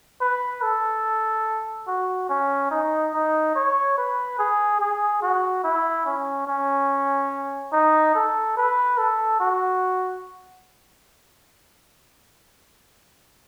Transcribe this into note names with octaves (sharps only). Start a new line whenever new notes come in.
B4
A4
F#4
C#4
D#4
D#4
C#5
B4
G#4
G#4
F#4
E4
C#4
C#4
D#4
A4
B4
A4
F#4